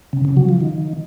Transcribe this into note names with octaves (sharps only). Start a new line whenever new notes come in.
C#3
C#3
F#3
F3
D#3